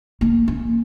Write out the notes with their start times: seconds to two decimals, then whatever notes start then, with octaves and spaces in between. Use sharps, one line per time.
0.21 A#3
0.48 C#4